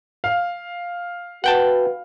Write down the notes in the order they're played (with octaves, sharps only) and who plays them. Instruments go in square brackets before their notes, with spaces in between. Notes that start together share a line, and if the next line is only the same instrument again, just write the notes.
[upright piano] F5
[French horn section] F#4 B4 [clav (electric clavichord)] F#5 G5 A5